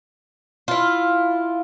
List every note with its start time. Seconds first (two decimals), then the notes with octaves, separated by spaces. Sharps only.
0.68 E4 F4